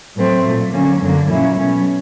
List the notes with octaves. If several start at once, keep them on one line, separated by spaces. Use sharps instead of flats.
A2 F#3 A3 C4
A#2 F#3 A3
D3 F#3 A#3 C#4
F#2 D3 F#3 A#3
A#2 F#3 A#3 C#4 E4
B2 F#3 A3 C#4